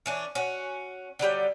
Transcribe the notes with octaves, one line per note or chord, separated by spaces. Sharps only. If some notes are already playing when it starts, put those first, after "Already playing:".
E3 C#4 D4
C#4 F#4
D3 F#3 G3 G5